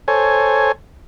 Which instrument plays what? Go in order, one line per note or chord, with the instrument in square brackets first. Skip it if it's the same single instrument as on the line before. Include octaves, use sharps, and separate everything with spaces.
[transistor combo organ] A4 C5 C#5 G#5